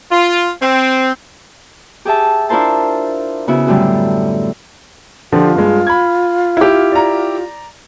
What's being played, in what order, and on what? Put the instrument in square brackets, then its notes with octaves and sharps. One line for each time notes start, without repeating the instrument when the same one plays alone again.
[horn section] F4
C4
[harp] G4 G#4 E5 A5
D4 E4 F4 A#4 C5 A5
C#3 B3 E4 F#4
F#2 A2 D3 G3
[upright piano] D3 F3 G4 [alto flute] F4
[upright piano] G2 G#3
B5 G#6
[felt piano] E4 G4
[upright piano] D5 A#5